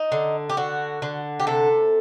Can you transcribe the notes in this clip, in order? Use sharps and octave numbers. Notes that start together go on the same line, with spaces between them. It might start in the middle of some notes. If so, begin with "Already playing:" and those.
Already playing: D#4
D3
G4
D3 F#4
D3
G4
C3 A4